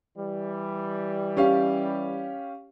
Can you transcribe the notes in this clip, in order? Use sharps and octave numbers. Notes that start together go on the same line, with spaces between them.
E3 G3
C#4 G4 F5